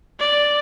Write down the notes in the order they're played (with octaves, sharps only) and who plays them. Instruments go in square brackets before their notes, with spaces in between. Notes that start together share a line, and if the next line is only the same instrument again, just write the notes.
[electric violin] D5